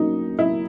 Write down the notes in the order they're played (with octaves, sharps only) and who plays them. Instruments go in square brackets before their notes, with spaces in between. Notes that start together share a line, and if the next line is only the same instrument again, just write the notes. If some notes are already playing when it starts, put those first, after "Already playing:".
Already playing: [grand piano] F#3 A#3 C#4 F#4 A#4 [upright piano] D#4
[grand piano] F#3 [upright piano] E4